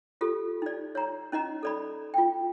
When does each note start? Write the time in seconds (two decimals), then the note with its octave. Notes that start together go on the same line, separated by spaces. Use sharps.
0.21 F4 G4 A4
0.62 D#4 D5
0.95 C#5 A#5
1.32 C#4 D#4 D#5 A#5
1.63 A4 D5 B5
2.14 F4 G5